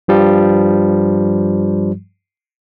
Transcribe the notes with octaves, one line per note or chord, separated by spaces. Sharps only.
G2 F3 G3